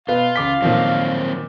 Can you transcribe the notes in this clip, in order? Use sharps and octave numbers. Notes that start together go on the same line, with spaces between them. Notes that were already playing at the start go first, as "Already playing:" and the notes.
B2 F4 B4 F5
C#2 D6 B6
A#2 D#3 F3 F#3 C4